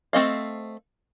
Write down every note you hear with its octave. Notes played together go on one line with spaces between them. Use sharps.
A3 C4 D#5 F5